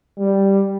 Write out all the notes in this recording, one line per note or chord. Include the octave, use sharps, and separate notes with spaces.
G3